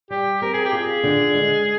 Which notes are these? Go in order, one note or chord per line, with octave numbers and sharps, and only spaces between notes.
G3 G4
C4 A#4
G#4
G4
F4 G#4
D3
G#3